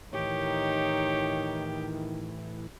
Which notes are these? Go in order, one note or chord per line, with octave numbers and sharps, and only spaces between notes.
A2 D#3 E3 D#4 G4 C#5